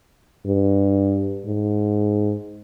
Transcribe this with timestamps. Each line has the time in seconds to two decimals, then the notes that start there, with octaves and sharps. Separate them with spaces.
0.47 G2
1.46 G#2